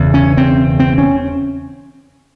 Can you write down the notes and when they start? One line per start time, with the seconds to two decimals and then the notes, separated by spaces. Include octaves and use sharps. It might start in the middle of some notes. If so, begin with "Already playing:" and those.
Already playing: E1 E2 C#3
0.14 C#4
0.37 C4
0.80 C4
0.98 C#4